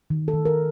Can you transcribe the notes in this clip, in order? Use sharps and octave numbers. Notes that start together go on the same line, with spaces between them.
D#3
A4
D#3
A#4